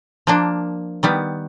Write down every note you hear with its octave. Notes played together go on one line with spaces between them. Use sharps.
F3 A#3 D4
D#3 G3 B3